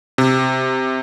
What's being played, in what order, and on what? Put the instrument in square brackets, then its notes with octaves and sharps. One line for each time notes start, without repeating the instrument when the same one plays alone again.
[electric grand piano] C3